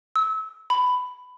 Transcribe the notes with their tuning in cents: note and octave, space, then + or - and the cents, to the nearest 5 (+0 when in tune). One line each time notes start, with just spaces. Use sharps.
E6 -30
B5 +15